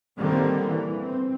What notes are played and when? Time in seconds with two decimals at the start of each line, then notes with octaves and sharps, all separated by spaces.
0.18 D3 D#3 G3 A#3 C4
0.66 E3
1.01 C4